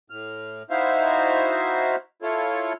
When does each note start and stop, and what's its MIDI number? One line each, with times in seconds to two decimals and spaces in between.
0.10 0.63 45
0.10 0.63 89
0.70 1.96 63
0.70 1.96 64
0.70 1.96 66
0.70 1.96 72
0.70 1.96 76
0.70 1.96 77
2.22 2.73 64
2.22 2.73 65
2.22 2.73 69
2.22 2.73 73